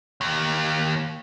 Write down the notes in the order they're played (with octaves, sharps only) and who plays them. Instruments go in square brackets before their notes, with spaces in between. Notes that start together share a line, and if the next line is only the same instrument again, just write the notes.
[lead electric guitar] D#2